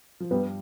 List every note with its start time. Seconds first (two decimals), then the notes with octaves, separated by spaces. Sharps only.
0.20 F3
0.31 G2 G3 B3